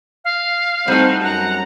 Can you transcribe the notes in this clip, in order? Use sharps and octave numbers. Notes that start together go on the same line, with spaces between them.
F5
G3 A3 C4 D#4 C5 F#5
F#2 F#5 A#5